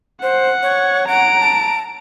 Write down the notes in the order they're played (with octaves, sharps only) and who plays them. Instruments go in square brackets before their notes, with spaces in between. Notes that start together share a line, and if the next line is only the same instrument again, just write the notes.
[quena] C5 [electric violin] F#5
[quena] C#5
[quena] F#5 [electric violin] A#5 D7
[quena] A5